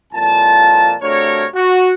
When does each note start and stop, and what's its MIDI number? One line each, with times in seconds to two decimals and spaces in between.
0.14 0.93 36
0.14 0.93 41
0.14 0.93 46
0.14 0.93 65
0.14 0.93 81
1.02 1.45 48
1.02 1.45 57
1.02 1.45 62
1.02 1.45 66
1.02 1.45 70
1.02 1.45 73
1.54 1.93 66